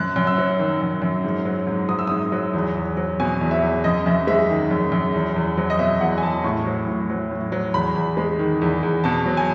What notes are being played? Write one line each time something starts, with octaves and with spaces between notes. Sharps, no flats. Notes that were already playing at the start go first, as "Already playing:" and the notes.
Already playing: F#2 F#6
F#2
E6
F#3
D#3
F#2
F#2
G#2
F#3
G#2
F#3 D#6
E6
G#2 D#6
F#3
E2
E2
F#3
B2 G#5
E2
E5
E2
F#2 D#5
F#2 E5
G#3 E5
D#3
F#2
F#2
E2
E2
F#3
D#5
B2 E5
E2 F#5
G#5
E2 A5
A2 C#6
F#3
A2
F#3
A2
F#3
E2 B5
E2
G#3
D#3
E2
E2
B2 A5
F#3
G#5